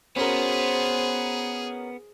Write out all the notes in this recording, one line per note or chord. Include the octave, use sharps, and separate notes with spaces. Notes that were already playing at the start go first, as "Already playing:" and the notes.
B3 C#4 F#4 G#4 A#4 C5